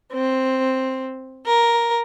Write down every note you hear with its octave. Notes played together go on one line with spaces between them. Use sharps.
C4
A#4